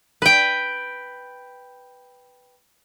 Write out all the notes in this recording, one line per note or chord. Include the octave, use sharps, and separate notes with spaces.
B4 G5